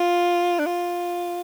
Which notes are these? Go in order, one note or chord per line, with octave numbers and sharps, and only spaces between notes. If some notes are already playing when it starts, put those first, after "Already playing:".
Already playing: F4
D4
F4